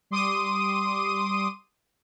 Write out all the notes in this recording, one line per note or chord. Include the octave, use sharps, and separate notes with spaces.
G3 C6 D6 D#6 D#7